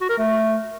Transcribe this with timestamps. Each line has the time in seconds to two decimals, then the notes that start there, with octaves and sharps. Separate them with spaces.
0.01 F#4
0.10 A#4
0.18 A3